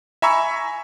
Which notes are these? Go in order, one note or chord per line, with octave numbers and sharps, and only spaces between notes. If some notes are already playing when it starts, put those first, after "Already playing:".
E5 G#5 A#5 B5 C#6 E6